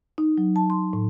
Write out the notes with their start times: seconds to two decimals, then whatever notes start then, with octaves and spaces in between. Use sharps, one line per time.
0.18 D#4
0.38 F#3
0.56 A5
0.70 C6
0.93 A2